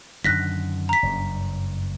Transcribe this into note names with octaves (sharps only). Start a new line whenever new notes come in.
F#2 D3 D#3 F#6 A#6 B6
A#5 B6
F#1 G2